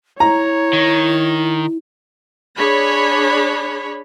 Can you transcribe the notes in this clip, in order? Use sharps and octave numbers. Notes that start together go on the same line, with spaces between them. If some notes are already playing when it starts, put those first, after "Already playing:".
E4 C#5 A#5
D#3
D4 G#4 C#5 B5